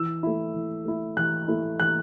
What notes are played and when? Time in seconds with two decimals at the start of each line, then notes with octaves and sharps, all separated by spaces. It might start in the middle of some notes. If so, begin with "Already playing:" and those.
Already playing: E3 E6
0.23 A3 E4
0.54 E3
0.85 A3 E4
1.17 E3 F#6
1.48 A3 E4
1.79 E3 F#6